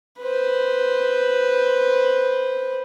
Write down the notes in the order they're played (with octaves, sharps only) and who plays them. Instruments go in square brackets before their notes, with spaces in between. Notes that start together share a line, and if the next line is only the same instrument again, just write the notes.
[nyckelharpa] B4 C5